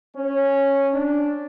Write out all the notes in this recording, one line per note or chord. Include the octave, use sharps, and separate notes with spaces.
C#4
D4